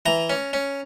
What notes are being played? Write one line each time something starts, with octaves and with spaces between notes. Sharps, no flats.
E3 A#5
C#4
C#4